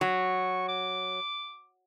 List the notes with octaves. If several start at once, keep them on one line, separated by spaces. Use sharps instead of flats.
F#3 C#6
D6